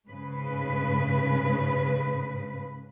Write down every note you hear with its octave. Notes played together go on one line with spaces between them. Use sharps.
G#2 C#3 B4